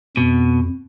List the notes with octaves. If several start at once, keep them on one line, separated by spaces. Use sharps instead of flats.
F2 B2